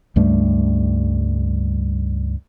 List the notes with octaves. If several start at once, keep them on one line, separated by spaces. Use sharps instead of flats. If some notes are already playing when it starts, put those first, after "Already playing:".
C#2 G2 G3 A3